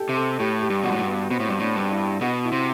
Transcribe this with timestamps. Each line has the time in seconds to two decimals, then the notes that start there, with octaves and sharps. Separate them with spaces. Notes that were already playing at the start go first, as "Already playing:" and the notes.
Already playing: G4 A4
0.09 C3
0.16 A4
0.40 A2 G4
0.62 G4
0.70 G2
0.83 B2 F#4
0.92 A2
1.00 G2
1.07 B3
1.30 B2 C4
1.40 A2
1.49 G2
1.59 A2 D4
1.76 G2 D4
1.91 E4
2.21 B2 F#4
2.45 E4
2.52 C3